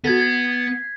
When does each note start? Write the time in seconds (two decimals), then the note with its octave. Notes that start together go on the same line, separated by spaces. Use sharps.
0.04 B3 F#4 A4 G#6 A6 B6
0.20 G#6 C7